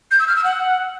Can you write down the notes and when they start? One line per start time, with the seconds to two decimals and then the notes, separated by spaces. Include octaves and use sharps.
0.11 G6
0.20 E6
0.28 F6
0.36 E6
0.44 F#5